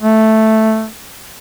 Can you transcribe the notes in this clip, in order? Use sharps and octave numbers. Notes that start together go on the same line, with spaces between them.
A3